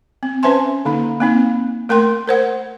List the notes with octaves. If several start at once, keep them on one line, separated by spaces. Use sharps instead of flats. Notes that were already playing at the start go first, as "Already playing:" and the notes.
C4
C#4 B4 C5 E5 G#5 C6
D3 A#3 D#4
A#3 C4 D#4
A3 A#4 G5 C6
A#4 C5 F#5